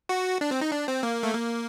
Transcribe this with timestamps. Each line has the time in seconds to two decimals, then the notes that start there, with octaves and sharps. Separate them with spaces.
0.09 F#4
0.41 D4
0.51 C4
0.61 D#4
0.72 D4
0.88 C4
1.03 A#3
1.23 A3
1.35 A#3